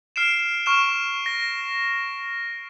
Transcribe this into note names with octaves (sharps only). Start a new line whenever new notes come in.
F6 C7 D7 E7
C#6 F6 E7
A#6